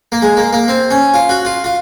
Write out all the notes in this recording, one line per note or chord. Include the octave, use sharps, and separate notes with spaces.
A#3
G#3
A#3
A#3
C4
C#4
F4
F#4
F4
F4